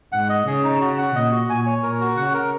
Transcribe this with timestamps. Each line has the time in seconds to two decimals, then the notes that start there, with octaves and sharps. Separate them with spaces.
0.12 G#2 F#5
0.29 D#5
0.47 C#3 G#4
0.64 D#4
0.81 F#4
0.98 F#5
1.15 A#2 D#5
1.31 F#4
1.49 A#2 G#5
1.66 C#5
1.82 A#2 A#4
2.01 F#4
2.17 C#3 F#5
2.34 A#4